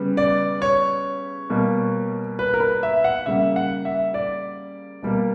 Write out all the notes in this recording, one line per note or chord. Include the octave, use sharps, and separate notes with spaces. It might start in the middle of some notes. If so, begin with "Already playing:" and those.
Already playing: C#3 G3 B3
D5
C#5
B2 G3 A#3
B4
A#4
B4
E5
F#5
C#3 G3 A#3 E5
F#5
E5
D5
B2 G3 A#3